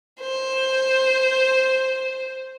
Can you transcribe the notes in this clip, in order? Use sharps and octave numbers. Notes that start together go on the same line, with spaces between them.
C5